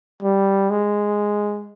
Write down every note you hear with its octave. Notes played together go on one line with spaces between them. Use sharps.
G3
G#3